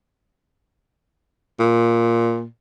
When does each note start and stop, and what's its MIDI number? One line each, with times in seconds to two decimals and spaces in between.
1.59 2.46 46